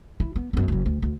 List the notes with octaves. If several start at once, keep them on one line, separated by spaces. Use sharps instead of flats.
E4
B3
F#2 B3
F#1 F#3
D2
D2